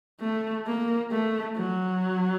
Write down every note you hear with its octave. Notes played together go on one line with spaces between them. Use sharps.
A3
A#3
A3
F#3